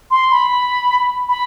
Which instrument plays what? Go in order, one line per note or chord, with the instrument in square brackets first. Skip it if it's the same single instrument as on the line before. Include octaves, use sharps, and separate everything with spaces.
[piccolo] C6
B5
B5